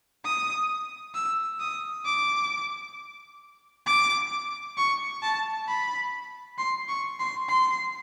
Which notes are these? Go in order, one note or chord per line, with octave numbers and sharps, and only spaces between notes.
D#6
E6
D#6
D6
D6
C#6
A5
B5
C6
C#6
C6
C6